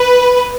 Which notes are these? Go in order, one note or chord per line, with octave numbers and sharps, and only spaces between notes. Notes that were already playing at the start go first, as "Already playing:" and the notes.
Already playing: B4